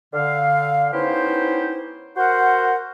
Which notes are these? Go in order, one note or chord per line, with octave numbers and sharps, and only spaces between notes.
D3 F5
B3 C#4 D#4 E4 G4 C5
F#4 A#4 C5 F#5